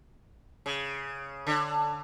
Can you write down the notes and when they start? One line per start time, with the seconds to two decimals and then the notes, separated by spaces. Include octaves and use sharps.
0.66 C#3
1.47 D3